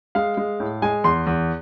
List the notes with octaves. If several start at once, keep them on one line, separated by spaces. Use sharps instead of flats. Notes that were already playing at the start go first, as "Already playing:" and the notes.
G#3 F5
G#3
A2
G#3 G#5
E2 C6
E2